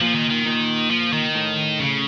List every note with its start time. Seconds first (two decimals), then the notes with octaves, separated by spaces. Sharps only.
0.01 A#2 F3
0.15 D#3
0.31 D#3
0.46 A#2
0.91 F3
1.13 D#3
1.35 A2
1.79 C#3